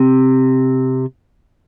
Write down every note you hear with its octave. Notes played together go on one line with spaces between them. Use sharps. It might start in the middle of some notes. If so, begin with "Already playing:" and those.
Already playing: C3